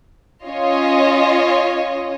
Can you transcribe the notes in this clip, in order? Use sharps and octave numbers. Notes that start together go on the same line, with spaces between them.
C#4 F4 C#5 D#5